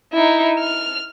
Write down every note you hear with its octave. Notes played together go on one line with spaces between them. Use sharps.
D#4 E4
F6